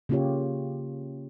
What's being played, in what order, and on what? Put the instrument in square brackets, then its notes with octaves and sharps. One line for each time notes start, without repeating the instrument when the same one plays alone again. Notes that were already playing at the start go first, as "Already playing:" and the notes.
[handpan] C#3 A#3 C#4 F4 G4 C#5